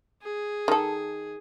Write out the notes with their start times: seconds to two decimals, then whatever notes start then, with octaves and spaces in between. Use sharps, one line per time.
0.23 G#4
0.68 D#3 A4